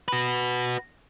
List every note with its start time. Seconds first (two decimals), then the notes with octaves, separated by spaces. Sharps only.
0.08 F#4 B4